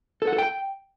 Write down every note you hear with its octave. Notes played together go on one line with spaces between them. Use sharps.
A4
F#5
A4
G5